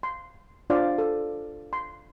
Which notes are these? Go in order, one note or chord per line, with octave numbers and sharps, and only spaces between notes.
C6
D4 F4 C5 D5 F5
A4
C6